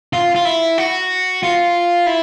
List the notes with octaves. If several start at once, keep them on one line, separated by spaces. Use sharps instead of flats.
F4
F4
E4
F#4
F4
E4